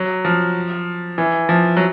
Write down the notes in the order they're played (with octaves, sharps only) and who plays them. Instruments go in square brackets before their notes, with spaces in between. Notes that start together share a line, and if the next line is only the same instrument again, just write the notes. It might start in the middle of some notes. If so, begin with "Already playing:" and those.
Already playing: [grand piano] F#3
F3
E3
F3
F#3